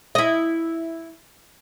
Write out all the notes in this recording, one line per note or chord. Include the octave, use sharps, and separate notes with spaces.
E4 D#5